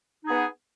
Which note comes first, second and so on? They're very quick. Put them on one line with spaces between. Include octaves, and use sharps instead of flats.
D#4 G#4 B3